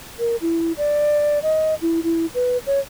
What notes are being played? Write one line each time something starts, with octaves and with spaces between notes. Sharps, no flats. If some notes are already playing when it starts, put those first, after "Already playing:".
A#4
E4
D5
D#5
E4
E4
B4
C#5